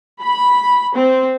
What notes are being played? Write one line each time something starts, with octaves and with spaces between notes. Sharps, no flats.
B5
C4